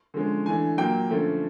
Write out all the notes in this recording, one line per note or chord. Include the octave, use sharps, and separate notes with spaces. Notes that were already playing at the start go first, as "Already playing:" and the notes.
D3 F3 G#3 C#4
E3 A3 D4 G#5
A#2 F#3 A#3 G5
D3 F3 A3 C#4